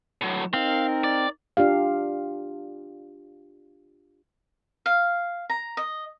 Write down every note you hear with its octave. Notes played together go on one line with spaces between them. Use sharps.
A2 F#3
C4 D#4 A#4 F5
D5
D4 F4 G4 F5
F5
A#5
D#5